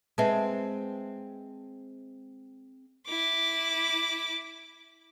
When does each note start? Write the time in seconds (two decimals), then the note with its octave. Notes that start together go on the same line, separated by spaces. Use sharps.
0.18 G#3 C4 B4 E5 A5
3.07 E4 D6